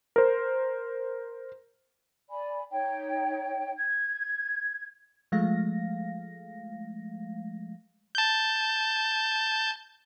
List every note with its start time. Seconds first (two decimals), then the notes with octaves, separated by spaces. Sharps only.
0.16 A#4 C5
2.30 D5 G#5 B5
2.71 D#4 C#5 G5
3.77 G#6
5.32 F3 G#3 A3 F5 A#6
8.15 A5 G6